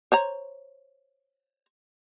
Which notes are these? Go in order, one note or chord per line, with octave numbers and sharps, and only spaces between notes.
C5 C#5 A#5